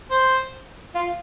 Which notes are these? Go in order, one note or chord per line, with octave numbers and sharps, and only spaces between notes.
C5
F4